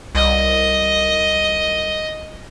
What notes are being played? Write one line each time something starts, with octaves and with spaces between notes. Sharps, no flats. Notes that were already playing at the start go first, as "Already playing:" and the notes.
C2 D#5